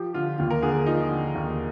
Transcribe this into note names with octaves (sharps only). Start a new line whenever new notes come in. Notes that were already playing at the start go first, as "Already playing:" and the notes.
Already playing: F3 G4
D3 F4
D#2 F4
A#4
D3 G#4
F3 D#4
D3
D#2